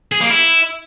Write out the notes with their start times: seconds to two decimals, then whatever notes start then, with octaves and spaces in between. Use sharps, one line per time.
0.12 G#4
0.21 A#3
0.30 E4